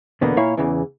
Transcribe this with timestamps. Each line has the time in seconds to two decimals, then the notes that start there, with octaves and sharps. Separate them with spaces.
0.21 E2 B2 D3 A#3 B3
0.37 A#2 A#3 E4 C#5 F5
0.57 E2 C#3 E3